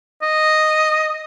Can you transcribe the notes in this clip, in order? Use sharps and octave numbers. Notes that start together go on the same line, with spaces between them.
D#5